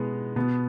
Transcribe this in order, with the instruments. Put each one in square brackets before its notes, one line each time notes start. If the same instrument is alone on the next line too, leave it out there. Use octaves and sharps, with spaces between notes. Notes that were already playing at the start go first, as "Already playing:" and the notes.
Already playing: [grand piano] B2 G#3 B3
B2 B3